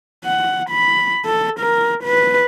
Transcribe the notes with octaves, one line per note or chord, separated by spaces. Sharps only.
F#5
B5
A4
A#4
B4